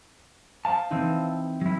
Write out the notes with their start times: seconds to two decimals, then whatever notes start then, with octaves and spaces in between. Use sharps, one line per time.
0.65 C5 F5 A5
0.90 E3 C4 D#4
1.61 F#3 E4